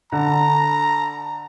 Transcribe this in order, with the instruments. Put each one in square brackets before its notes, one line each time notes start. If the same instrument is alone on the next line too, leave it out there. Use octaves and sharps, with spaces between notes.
[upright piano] D3 [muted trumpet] A#5